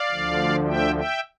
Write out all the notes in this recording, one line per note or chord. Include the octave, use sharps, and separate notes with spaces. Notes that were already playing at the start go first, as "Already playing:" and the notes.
Already playing: D5 F5
D2 D3 F3
E5 G5
E5 G5